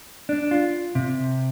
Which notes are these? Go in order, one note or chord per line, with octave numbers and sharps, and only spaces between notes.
D4
F4
C3